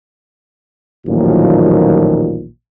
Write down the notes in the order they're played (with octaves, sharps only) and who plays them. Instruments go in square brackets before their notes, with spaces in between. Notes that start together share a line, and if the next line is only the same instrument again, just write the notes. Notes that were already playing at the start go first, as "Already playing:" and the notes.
[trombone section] A1 D#2 A#2 D#3 F3 F#3